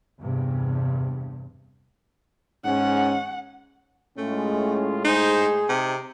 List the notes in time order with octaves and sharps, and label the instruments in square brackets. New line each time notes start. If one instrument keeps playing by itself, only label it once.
[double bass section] E2 G2 C3
[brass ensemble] G#2 C#4 [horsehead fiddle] F#5
[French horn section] A2 G#3 [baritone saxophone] A3 [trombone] C#4 [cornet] F4
[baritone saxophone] D#4 [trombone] G#4 [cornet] C5
[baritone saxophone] C3 [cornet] D#4